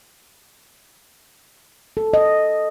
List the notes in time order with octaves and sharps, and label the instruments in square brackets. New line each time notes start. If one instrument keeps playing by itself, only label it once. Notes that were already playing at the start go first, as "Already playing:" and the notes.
[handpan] A4
D#5